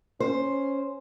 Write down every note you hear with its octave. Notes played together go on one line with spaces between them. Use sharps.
C#4 C5